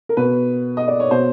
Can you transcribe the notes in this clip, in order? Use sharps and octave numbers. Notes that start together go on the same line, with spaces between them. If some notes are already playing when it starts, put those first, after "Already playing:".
A#4
B2 B4
D#5
D5
C#5
B2 C5